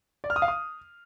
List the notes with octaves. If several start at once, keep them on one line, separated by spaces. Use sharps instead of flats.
D5
F6
D#6
F5
D#6